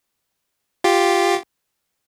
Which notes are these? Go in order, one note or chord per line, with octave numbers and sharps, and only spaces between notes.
F4 G4